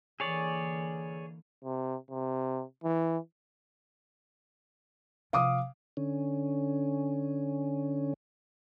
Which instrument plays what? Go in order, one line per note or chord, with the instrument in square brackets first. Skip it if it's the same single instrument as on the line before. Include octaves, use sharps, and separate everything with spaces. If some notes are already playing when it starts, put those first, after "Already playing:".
[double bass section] D3 E3 A#3 [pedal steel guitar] G#4 C#5 D5
[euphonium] C3
C3
E3
[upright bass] C3 F3 [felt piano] F5 D6 D#6
[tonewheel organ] D3 C#4